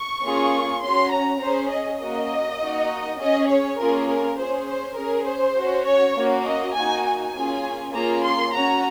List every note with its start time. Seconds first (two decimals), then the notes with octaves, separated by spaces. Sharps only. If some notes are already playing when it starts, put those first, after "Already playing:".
Already playing: C#6
0.22 A#3 C#4 F4 G#4
0.81 C#4 F#4 C6
1.12 A#5
1.41 C#4 C5
1.46 G#4
1.71 D#5
2.00 A#3 C#4 F#4 D#5
2.60 A#3 D#4 F#4
3.19 C#4 G#4 D#5
3.49 C#5
3.79 A#3 C#4 F4 G#4 A#4
4.08 A#4
4.37 C#4 G#4 C5
4.68 C5
4.97 C#4 G#4 A#4
5.26 C5
5.57 C#4 F#4
5.86 C#5
6.17 A#3 C#4 F#4
6.45 D#5
6.75 A#3 D#4 F#4 G#5
7.05 G#5
7.35 A#3 C#4 F4 G#4
7.94 A#3 C#4 F4 G#4 A#5
8.23 C6
8.53 C#4 F#4 A#5